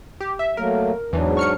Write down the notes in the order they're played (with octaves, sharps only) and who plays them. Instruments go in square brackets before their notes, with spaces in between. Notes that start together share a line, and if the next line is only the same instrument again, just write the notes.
[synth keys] G4
E5
[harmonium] F#3 A3 A#3 [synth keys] A#4
[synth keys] E2 E3 [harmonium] G#2 F#3 D4
[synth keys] C#6 F6 C#7